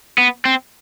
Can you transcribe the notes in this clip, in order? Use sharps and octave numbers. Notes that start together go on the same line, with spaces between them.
B3
C4